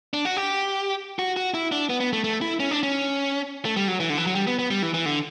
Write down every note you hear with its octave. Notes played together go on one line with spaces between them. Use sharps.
D4
F#4
G4
F#4
F#4
E4
D4
B3
B3
A3
A3
E4
C#4
D4
C#4
A3
G3
F#3
E3
D3
E3
F#3
G3
B3
B3
G3
E3
E3
D3